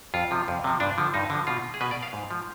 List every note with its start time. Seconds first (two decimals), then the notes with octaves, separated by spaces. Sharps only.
0.14 F2 F4
0.31 C3 F3
0.48 F2
0.64 C3 F3
0.80 G2 D4
0.98 D3 F3
1.14 G2 D#4
1.30 D3 F3
1.47 B2 F4
1.74 G#4
1.81 B2 B4
1.91 D5
2.03 F5
2.13 G#2
2.31 F3